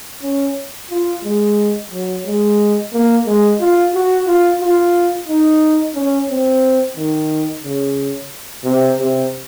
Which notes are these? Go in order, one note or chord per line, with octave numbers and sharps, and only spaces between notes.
C#4
F4
G#3
F#3
G#3
A#3
G#3
F4
F#4
F4
F4
D#4
C#4
C4
D#3
C#3
C3
C3